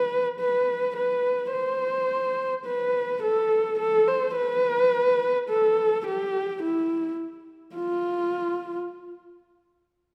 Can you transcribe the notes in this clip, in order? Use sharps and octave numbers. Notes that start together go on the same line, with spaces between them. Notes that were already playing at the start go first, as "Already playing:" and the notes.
Already playing: B4
B4
B4
C5
B4
A4
A4
C5
B4
A4
G4
E4
F4